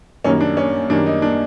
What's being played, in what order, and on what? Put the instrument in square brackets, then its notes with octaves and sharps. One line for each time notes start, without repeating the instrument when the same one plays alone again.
[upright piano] F#2 D#3 G3 A#3 C#4
D4
C#4
F#2 D#3 G3 A#3 D4
D#4
D4